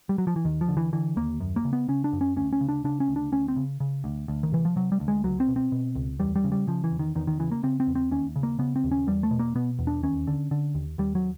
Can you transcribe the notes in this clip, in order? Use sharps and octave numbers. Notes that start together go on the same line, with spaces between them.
G3
F#3
F3
E3
D#2 D#3
F3
D3
E3
D3 E3
D#2 A#3
F#2
A#3
C#3
B3
C#3 C#4
D4
F#2
C#4
D2 C#4
C#4
C#3
D4
C#3 D4
C#4
D2
D4
D2 C#4
C4
C#3
C#3
D2
D2
D#3
C3 E3
F3
C3 F#3
G3
D2
G#3
C#2 F#3
C4
B2
C4
B2
C#2
E2 G3
G3
C#3
G3
C#3 F3
E3
E2
D#3
E2 D#3
D#3
C#3 E3
A#3
C#3 C4
C4
E2
C4
D#2 C#4
C#3
A#3
C#3 B3
C4
D#2
C#4
E2 G3
A3
B2
A#3
B2 B3
E2
D4
D#2 C#4
D3
D3
D#2
D#2 G3
F#3